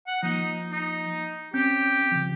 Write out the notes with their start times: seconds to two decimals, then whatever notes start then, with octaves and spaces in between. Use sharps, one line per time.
0.07 F#5
0.23 F3 A#3 D#4
0.72 D#4
1.54 C4 C#4 G4 G6
2.12 C#3 F3